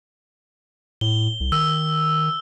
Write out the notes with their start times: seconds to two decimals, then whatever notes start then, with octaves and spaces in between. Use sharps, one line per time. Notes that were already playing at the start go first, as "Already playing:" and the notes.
1.01 A2 G7
1.40 C2
1.52 D#3 E6